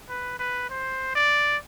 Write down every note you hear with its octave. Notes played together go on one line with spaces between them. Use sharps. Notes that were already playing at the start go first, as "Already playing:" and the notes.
B4
B4
C5
D5